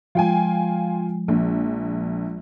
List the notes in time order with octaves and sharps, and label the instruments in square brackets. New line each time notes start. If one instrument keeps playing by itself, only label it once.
[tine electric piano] F3 G#3 [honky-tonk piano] F4 G5 G#5
[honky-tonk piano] A#1